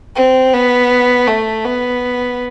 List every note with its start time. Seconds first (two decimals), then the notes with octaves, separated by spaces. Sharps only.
0.16 C4
0.54 B3
1.28 A3
1.65 B3